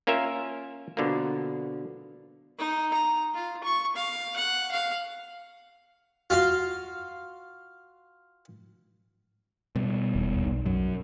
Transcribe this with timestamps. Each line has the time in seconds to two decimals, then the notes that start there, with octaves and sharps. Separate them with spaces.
0.07 A#3 C#4 F4 A#4 E5
0.97 B2 D3 F3 A#3
2.59 D#4
2.93 A#5
3.34 F4
3.63 C#6
3.95 F5
4.36 F#5
4.71 F5
6.30 F4 F#4 F5 C6
9.76 B2 G3
10.14 E1
10.44 B1
10.66 F#2 F#3